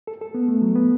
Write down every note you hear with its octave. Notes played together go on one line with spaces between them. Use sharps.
A4
A4
B3
A3
F#3
B3